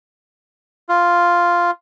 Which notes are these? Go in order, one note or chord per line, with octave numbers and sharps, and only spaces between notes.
F4